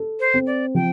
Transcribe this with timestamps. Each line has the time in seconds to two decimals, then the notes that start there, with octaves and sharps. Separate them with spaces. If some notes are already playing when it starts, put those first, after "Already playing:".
Already playing: A4
0.20 C5
0.34 C4
0.47 D5
0.75 F3 G5